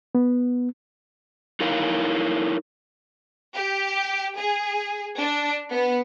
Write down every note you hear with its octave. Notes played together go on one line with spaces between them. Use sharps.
B3
D#4 E4 A#4 C#5 F5
G4
G#4
D4
B3